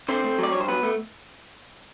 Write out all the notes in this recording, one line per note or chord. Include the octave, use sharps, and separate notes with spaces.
D3 C4 C5
A3
F#3 D5
G2 C#5
C5
F#3 B3 B4
A3